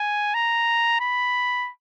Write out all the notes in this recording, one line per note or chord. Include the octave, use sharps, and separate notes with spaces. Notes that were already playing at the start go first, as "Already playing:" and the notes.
Already playing: G#5
A#5
B5